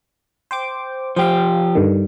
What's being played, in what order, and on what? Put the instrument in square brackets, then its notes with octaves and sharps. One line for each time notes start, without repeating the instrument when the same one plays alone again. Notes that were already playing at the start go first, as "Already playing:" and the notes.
[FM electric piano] C5 G5 D6
[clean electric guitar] F3 G4 [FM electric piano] C5 F5
[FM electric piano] G2 D3 D#3